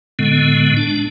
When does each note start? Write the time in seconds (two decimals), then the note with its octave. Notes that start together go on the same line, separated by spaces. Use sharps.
0.19 A2 D3 G#3 B3
0.77 D4